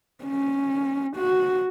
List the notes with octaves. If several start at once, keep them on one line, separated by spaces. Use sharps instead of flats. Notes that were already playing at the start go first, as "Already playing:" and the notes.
C#4
F#4